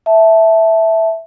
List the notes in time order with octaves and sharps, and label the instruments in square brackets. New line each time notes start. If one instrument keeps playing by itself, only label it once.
[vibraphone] E5 A5